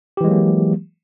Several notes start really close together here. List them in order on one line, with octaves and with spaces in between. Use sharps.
G4 E3 G#3 F#3 A#3